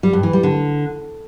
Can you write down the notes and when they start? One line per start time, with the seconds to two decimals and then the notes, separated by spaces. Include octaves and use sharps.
0.03 G3
0.13 G2
0.23 E3
0.33 G3
0.43 D3